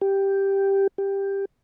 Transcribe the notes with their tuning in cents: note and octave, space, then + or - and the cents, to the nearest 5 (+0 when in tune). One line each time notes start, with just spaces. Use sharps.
G4 +0
G4 +10